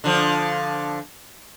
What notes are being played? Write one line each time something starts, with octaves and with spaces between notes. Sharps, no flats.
D3 F3